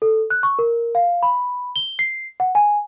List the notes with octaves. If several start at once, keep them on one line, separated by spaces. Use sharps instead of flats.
A4
F#6
C#6
A#4
F5
B5
G7
C7
F#5
G#5